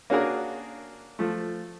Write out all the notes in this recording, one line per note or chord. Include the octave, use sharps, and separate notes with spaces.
A#3 C#4 D4 F#4 G#4 A#4
F3 A3